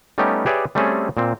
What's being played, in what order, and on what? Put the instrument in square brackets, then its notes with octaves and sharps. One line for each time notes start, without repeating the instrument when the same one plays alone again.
[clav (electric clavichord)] G3 A3 B3 C#4 D#4 G4
G4 G#4 B4 C#5 D5 E5
G3 A3 C4 C#4 G#4 A4
A#2 C4